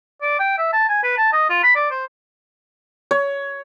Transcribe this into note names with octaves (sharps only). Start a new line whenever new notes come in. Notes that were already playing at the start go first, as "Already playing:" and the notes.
D5
G5
E5
A5
G#5
B4
A5
D#5
F4
B5
D5
C5
C#5